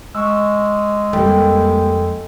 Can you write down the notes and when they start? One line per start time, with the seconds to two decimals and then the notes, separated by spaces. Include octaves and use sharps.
0.15 G#3 C#6 E6
1.13 F2 G3 A#3 A4 G5